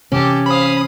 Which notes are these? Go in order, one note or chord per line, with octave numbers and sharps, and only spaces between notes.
C3 E3 C#4 G4 A4
C5 F5 B5 D#6